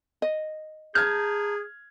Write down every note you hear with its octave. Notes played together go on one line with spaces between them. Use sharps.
D#5
G#4 A5 A#5 F6 G6 G#6